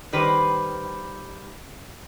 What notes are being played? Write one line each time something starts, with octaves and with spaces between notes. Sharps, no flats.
D#3 G3 B4 C5